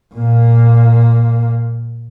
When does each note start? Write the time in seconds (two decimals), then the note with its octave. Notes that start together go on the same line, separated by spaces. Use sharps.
0.15 A#2 A#3